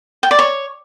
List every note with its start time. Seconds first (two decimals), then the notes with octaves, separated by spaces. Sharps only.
0.23 G5
0.31 D5
0.39 C#5